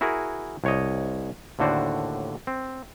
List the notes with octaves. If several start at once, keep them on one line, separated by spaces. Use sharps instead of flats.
E4 F#4 G#4 A#4
C2 C#5 D#5
D#2 A2 D3 F#4 C5 D5
C4